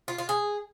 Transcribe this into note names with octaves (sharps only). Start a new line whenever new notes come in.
F4
F4
G#4